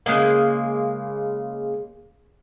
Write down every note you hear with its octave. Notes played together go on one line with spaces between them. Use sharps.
C#3 G#3 A#3